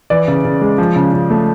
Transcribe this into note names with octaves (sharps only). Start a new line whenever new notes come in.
E3 D5
C#3
C#3
G#3
F3
C#3
C#3
A3